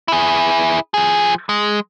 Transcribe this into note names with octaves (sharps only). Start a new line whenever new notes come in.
E4 G#4
F3 G#4
G#3